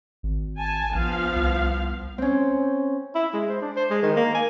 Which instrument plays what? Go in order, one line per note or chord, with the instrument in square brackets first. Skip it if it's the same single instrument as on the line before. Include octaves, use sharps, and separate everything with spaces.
[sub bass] G#1
[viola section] G#5 A5
[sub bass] A#1 [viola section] F3 B3 F5
[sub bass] C2
[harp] C4 C#4
[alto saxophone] E4
G#3
C5
D4
C5
G#3
D#3
A#3
G#5